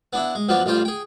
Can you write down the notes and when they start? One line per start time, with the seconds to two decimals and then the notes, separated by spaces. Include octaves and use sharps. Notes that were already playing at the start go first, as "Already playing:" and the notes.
0.13 B3 D4 E4
0.35 G#3
0.49 F#2 F3 F#3 B3 D4
0.66 A1 G3 F4 C5 G5
0.85 G#4 G5